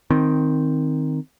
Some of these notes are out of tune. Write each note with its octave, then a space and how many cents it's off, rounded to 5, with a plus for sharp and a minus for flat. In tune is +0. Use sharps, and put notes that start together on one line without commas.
D#3 +0 C4 +0